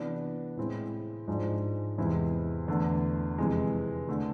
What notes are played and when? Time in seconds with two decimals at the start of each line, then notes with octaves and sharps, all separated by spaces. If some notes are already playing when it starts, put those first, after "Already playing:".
Already playing: C3 E3 B3 D4
0.57 A2 G#3 C4 E4
1.28 G#2 F3 G#3 D4
1.98 E2 C3 G#3 C4 E4
2.68 E2 D3 A3
3.38 F2 C3 E3 G#3
4.09 D3 A3